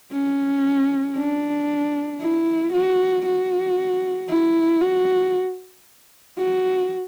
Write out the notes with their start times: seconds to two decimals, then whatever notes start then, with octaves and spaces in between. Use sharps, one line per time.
0.12 C#4
1.17 D4
2.21 E4
2.73 F#4
3.25 F#4
4.29 E4
4.81 F#4
6.38 F#4